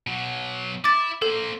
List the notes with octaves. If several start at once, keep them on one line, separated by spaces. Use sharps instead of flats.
B2 F#3
E4 D6 A6
A#3 A4 C5